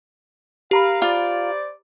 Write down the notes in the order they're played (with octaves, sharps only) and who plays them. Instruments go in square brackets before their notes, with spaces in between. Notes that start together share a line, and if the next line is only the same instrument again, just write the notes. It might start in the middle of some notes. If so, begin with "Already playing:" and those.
[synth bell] G4 A#5 B5 [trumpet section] A#4 F5
[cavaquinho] F4 [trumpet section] C5 D5